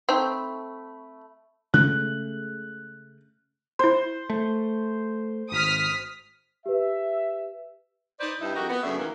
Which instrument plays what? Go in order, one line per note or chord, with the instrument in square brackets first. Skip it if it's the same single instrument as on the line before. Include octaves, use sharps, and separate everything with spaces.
[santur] A3 B5 [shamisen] C4 D#4
[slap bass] C#3 G#3 A3 [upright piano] F#6
[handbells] E4 C6 [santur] C5
[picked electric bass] A3
[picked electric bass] G#1 [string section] D#6 F6 B6
[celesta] G4 B4 [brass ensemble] E5
[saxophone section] D#4 B4 C5 D5
G2 C3 D#4 E4
F2 D#4 F#4 G4 A#4 D#5
B3
F#2 C#3 A3 D4 D5 E5
D#3 E3 A#3